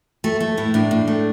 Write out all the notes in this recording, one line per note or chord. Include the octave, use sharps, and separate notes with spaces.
A3 A4
A3
A2 E4
A2 D4
A2
A3